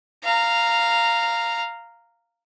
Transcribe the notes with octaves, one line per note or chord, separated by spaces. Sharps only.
F5 A#5